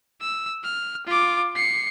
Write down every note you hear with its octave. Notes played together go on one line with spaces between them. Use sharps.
E6
F6
F4 D6
C7 C#7